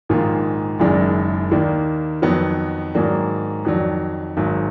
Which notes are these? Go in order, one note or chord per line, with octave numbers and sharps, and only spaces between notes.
A#1 G#2 D#3 A#3 F4
F#1 F#2 D#3 G#3 D4
D#2 D#3 A#3 D4
F2 D#3 F#3 B3
G#2 D#3 F#3 A#3 D4
F2 D#3 F#3 D4
G#1 G#2 F#3